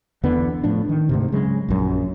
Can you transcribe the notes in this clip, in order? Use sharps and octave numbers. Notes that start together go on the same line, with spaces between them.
E2 D3 B3
A2 F3 D4
D#3
D2 G#2 C3
C#3 F#3 G#3
A#1 F#2